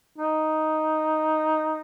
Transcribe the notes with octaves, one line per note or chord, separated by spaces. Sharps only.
D#4